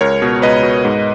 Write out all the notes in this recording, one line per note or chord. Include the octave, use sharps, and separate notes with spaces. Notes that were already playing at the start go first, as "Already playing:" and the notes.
C#2 A#4 C#5
B2
C#2 B4 D#5
B2
G#2